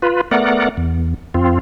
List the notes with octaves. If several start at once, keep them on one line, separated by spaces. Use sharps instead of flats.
F4 B4
A3 B3 A#4 D5 F#5
E2
F2 C4 F4